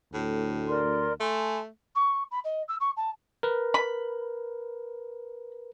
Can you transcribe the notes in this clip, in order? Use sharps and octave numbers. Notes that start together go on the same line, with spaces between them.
D2 A2
A#4 D5 C6
A3 G#5 A5 C6
C#6
B5
D#5
E6
C#6
A5
A#4 B4
B5